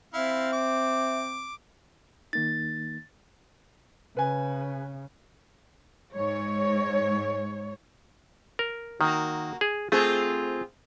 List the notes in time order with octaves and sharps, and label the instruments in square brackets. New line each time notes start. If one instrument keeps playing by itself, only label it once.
[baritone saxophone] C4 [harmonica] E4 F5 [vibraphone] E5
[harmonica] D6
[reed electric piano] D#3 A#3 D#4 [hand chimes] A6
[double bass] C#3 [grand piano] B4 G#5
[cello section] G#2 C#5
[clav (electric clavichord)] A#4
[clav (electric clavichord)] D#3 [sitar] A#3 F#4
[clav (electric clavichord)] G#4
[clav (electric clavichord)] A3 [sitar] C4 F4 G#4